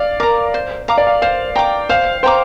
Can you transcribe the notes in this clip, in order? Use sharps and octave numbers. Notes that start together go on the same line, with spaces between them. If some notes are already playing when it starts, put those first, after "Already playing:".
Already playing: D5 F5
A#4 A#5 D6
C5
F5 A#5 D6
D5
F5
C5 F5
G5 A#5 D6
C5 F5
C5 G5 A#5 D6